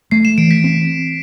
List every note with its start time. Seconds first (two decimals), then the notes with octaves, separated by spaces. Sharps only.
0.11 A3 C7
0.25 E7
0.38 E3 D7
0.51 B6
0.64 C4